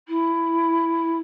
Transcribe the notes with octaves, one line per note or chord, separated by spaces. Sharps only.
E4